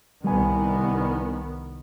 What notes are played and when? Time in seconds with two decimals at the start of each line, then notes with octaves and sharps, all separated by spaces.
0.24 C2 D#3 G3 B3 G#5